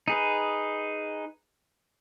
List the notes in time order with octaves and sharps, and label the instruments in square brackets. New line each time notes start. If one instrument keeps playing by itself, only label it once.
[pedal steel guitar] D#4 G#4 B4